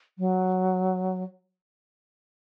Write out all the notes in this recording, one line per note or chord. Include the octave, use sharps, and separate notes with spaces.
F#3